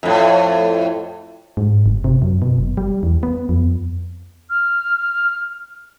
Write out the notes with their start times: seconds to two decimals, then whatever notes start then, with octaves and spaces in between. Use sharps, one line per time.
0.03 F2 A2
1.57 G#2
1.86 G1
2.04 C3
2.22 F#2
2.42 B2
2.58 F#1
2.77 G3
3.03 E2
3.23 B3
3.49 F2
4.50 F6